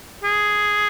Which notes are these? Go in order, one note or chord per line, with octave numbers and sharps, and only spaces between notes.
G#4